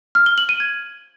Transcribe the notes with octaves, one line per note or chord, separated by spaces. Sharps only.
F6
G7
F#7
D#7
G#6